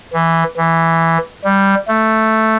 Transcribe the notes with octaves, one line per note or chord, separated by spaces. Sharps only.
E3
E3
G3
A3